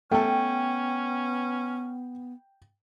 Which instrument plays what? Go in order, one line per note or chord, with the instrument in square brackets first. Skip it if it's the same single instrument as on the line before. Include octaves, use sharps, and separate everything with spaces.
[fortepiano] A3 A4 [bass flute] B3 [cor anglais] C#4 [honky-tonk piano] G5